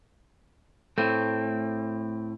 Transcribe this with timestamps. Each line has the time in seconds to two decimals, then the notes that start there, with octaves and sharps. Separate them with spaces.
0.98 A2 A3 C4